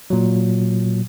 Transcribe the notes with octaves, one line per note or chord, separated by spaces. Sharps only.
A#2 F#3